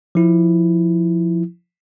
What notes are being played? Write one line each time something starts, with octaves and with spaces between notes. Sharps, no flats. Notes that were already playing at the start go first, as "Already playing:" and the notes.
F3 E4